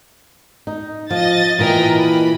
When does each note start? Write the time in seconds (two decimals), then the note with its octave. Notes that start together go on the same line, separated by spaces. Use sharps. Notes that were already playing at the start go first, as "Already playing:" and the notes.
0.67 D#4
1.11 F3 D#5 A6
1.59 A#2 E3 A#4 D#5 G5
1.99 B5